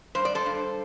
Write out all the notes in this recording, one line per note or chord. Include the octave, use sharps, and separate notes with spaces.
G2 C5
D5
A4 C5
G2